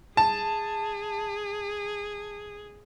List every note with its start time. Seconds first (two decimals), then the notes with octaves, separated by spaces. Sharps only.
0.17 G#4 A5